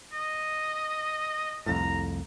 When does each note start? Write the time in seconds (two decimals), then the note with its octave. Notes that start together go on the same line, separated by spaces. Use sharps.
0.13 D#5
1.66 C2 F2 A2 A#5